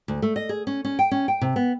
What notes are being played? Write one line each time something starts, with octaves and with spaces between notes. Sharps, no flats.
D2
A3
D#5
G#4
C#4
C#4
G5
C#4
G5
C3
B3